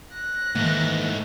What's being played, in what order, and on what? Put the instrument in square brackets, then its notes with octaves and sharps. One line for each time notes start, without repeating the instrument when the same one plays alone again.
[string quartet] F#6 A#6
[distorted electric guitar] G#2 A3 [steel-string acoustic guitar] D#3 E3 [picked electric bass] A#3